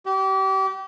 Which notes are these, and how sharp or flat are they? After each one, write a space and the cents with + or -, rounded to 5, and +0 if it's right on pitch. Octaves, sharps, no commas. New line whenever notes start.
G4 -30